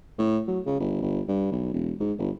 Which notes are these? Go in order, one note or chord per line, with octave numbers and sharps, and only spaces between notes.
A2
F#3
C#3
G1
G1
G2
B1
E1
G#2
G1